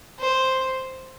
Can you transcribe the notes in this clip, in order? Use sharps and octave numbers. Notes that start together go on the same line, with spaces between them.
C5